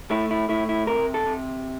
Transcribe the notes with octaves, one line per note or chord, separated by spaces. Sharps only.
A3 E4
E4
A3 E4
E4
C3 A#4
A4
C3